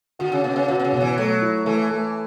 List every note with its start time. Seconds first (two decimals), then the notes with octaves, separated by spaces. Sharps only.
0.19 D3 F#4
0.32 C#3
0.44 B2 C#4
0.56 C#3
0.68 B2 F#4
0.80 B2
0.84 C#3
0.92 B2
1.01 E3
1.17 F#3 A3
1.41 E4
1.65 E3 A3
1.89 A3